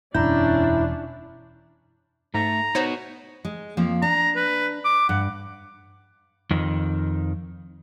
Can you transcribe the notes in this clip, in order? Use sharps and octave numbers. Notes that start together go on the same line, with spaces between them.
E1 F#2 C#4 D4 E4 A#5 G6
G#2 A3 A#5
B3 D#4 F#4 C5 C#5
G#3
F2 F3 A#3
D4 A#5
B4
D6
G2 F#5
F2 D#3